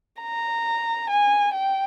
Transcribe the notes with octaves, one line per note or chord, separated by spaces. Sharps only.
A#5
G#5
G5